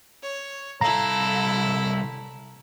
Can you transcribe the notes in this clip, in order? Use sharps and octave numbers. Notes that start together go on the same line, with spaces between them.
C#5
C2 E4 A4 F5 A#5